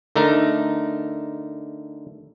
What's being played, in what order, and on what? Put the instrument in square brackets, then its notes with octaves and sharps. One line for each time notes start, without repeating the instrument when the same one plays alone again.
[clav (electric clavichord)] D3 A3 D#4 A#4